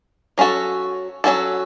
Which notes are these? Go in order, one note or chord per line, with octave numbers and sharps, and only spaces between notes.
F#3 C#4 F#4 A4
F#3 C#4 F#4 A4